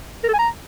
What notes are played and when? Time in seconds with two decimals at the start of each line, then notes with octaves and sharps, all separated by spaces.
0.24 A#4
0.29 A4
0.34 G#5
0.39 A#5